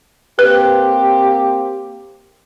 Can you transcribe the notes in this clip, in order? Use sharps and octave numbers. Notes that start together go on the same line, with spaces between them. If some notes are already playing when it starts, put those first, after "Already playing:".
A#3 C4 G4 B4